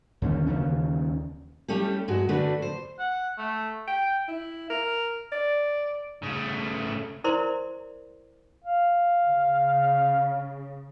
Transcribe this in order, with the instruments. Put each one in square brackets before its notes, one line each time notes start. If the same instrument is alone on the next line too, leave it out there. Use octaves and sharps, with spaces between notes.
[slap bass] D#2 D3 E3 C#4
D#2 C#3 E3 C#4
[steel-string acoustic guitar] G3 A3 C#4 E4 G4
G2 G#3 F#4
D3 A3 D4 F#4 B4
C5
[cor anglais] F#5
A3
[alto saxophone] G5
E4
A#4
D5
[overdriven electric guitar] C#3 A3
[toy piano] E4 A#4 C5 D5 A#5 C6
[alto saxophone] F5
[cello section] C#3